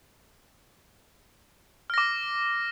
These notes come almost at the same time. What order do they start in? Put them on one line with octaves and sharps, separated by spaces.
F6 A#6 D6